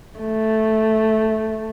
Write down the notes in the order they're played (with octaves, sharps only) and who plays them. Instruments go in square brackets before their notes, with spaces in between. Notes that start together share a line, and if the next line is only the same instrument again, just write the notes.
[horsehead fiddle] A3